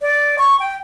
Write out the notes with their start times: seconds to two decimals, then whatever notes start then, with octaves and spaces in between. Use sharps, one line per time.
0.02 D5
0.39 C#6
0.60 G5